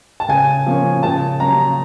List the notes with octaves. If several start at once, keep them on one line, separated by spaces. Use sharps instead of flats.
A5
C#3 G#5
F3 A#3 C#4
C#3 A5
F#3 A#3 C#4 A#5